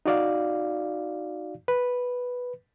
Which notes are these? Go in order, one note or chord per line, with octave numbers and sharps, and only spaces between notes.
D#4 F#4 D5 F5
B4